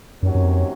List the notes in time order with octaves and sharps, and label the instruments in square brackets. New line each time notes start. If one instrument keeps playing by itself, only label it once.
[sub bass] F#2 [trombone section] C3 D#3 F#3 A#3 C#4
[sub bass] F#2
F2